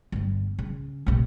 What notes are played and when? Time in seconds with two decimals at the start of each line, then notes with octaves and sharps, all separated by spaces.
0.12 G1 G3
0.59 C#3
1.06 A#1 C3